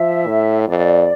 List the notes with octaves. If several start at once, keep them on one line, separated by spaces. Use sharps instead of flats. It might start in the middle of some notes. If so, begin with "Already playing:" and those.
Already playing: F3 E5
A2
F2 D5